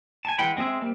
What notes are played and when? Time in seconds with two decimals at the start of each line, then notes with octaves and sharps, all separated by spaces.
0.25 G#5 A5
0.38 E3 G#3 F#5 G5 B5
0.57 G#3 C4 G#4 E5
0.81 G3 A#3 C4